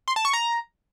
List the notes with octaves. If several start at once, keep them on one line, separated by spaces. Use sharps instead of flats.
C6
A5
C#6
A#5